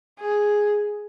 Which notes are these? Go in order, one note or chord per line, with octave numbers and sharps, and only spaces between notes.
G#4